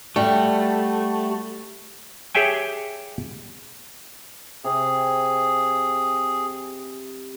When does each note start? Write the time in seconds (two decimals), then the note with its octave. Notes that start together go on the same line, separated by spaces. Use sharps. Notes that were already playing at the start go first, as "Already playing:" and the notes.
0.16 G3 A3 F#4
2.35 G4 G#4 C#5 E5 G5 G#5
4.64 C3 G#4